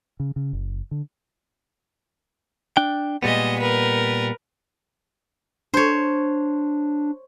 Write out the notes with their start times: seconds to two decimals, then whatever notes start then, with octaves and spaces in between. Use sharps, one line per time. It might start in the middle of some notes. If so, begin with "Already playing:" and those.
0.20 C#3
0.36 C#3
0.53 F#1
0.91 D3
2.77 D4 G5
3.23 A#2 G3 G#3 B3 D#5
3.59 A#4 B4
5.74 D4 C5 C#5